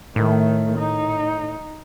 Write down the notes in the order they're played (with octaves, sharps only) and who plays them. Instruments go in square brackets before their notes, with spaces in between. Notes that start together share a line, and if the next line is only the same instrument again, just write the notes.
[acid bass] A2 [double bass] D#3 A3
[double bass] D#4